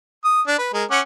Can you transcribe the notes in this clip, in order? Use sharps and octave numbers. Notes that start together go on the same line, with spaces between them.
D#6
D4
B4
G#3 A#4
C#4 F#5 D6